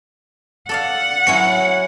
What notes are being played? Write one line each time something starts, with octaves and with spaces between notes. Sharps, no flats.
A4 D5 F5 F#5
F#3 C#4 E4 C#7